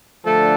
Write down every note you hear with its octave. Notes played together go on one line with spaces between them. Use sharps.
D3 F3 A3 D4 A4